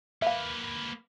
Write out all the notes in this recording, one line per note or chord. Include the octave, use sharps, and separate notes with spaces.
A#3 B4 E5 F5